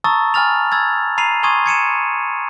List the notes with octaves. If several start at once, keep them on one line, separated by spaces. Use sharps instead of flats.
A5 A#5 C#6 D#6 E6 A6
G#5 B5 F6 A6 F7
B5 E6 G#6 A6
A#5 B5 C7 D#7 F7
G#5 C6 C#6 D#6 G#6 D#7
G#6 C#7 D#7 E7